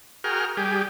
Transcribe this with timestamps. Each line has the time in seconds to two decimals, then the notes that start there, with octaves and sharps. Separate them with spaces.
0.24 F#4 G#4 A#4 G5 F6
0.57 G3 G4 G#4